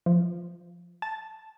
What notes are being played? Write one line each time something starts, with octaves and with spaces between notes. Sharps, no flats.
F3
A5